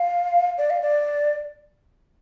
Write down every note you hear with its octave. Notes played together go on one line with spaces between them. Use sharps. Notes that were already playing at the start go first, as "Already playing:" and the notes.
Already playing: F5
D5
F5
D5